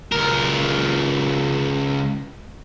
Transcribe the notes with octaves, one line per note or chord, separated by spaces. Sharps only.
C#2 A#4